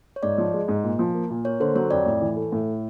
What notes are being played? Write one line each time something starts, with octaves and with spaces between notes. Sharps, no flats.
C#5
G#2 D5
F3
G#3
G#2
A#2
F3
A#3
A#2
A#3 C#5
D3 C5
F#3 C#5
F2 D5
A2
E3
A3
A2